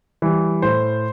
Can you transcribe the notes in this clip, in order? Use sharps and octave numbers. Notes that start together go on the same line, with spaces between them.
E3 G3
A2 C5